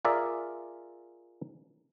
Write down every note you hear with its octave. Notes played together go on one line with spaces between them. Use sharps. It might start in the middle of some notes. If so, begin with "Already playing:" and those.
F4 G#4 A#4 D5 E5